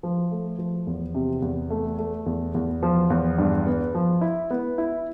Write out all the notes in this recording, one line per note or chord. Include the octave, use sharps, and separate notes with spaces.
F3
A3
F3
E2
C3
E2
A3
A3
E2
E2
F3
E2
G2
B3
F3
E4
B3
E4